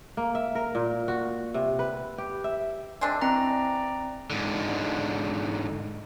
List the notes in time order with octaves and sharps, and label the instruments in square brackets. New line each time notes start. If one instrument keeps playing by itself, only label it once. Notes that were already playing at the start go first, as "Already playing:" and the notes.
[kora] A#3
E5
A#4
A#2
F#4
C3
B4
G4
E5
[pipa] G#3 C4 D4 [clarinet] D#5
[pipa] E3 [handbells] C4 A#5 [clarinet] D5
[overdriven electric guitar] G#2 D3